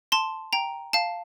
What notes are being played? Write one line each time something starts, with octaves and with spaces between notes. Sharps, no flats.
A5 C6
G5 A#5
F5 A5